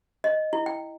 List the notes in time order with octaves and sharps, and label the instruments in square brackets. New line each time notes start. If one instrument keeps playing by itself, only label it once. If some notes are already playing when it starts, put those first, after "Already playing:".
[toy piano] D#5
E4
G5